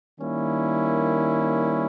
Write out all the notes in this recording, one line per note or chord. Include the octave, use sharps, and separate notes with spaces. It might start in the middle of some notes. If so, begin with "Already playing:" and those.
D#3 G3 A#3 C#4 E4